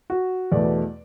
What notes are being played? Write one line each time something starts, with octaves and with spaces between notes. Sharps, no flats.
F#4
E2 B2 A3 D5